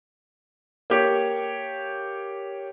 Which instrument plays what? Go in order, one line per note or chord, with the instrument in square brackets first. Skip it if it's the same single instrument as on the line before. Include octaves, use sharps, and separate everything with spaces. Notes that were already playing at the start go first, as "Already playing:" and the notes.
[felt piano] A#3 G4 C#5